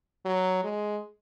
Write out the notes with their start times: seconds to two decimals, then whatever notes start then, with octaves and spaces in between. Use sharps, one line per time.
0.25 F#3
0.64 G#3